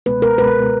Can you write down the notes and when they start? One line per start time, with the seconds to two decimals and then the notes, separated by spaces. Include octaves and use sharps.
0.06 C#2 B2 G#3 B3 B4
0.22 A#4
0.38 C#2 B2 G#3 B3 B4